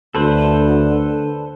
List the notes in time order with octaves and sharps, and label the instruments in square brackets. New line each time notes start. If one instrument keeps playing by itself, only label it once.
[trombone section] D2 [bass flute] D3 [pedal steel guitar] A4 B4 C5